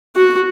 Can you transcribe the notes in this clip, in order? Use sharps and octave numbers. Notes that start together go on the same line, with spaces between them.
F#4